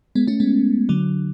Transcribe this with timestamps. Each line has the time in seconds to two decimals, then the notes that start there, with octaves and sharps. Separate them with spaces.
0.15 G#3 B3
0.27 A3 C#4
0.40 G#3 B3
0.89 D3 F#3